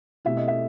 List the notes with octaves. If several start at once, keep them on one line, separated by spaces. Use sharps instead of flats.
B2 A3 C4 E4 G4 E5
D#5
E5